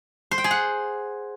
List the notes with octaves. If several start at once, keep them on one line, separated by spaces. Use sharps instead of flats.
C5
G5
G#4
F#5